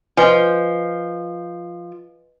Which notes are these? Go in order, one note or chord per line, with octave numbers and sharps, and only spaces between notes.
F3 B4 D#5 G#5